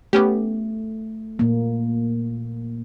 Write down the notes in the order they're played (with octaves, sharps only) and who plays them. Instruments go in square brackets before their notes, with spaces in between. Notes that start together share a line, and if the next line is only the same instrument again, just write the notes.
[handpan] A3 [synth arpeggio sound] B3 C#4 G4
[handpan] A#2 A#3